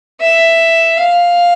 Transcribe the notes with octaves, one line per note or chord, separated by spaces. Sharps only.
E5
F5